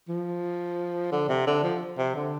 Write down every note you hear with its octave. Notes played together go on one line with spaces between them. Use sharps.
F3
D3
C3
D3
F3
C3
D3